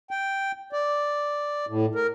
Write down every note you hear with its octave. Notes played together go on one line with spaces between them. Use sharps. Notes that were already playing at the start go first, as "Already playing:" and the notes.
G5
D5
A2
A#4